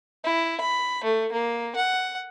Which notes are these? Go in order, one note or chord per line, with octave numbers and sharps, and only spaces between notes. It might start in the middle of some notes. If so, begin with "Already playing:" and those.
E4
B5
A3
A#3
F#5